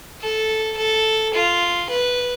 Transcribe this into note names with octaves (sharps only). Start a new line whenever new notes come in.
A4
A4
F4
B4